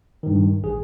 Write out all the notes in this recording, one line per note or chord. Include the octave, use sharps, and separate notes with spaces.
G2 D#3
A1 G#4